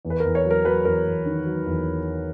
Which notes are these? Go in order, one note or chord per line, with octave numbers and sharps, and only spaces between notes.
E2
B4
A#4
E2
C#5
F#3
A#4
F#3 B4
E2 A#4
E2
D#3
F#3
E2